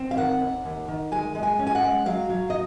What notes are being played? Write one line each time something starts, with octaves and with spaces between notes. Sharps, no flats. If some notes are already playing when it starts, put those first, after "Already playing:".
Already playing: C4
F5
D#3 F#5
D#2
D#2
D#3
G#3 G#5
G#3
G#5
C#4
G#5
F#5
G#3
F#3 F5
F#3
D#5